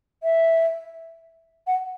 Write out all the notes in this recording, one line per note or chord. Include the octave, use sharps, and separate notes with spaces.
E5
F#5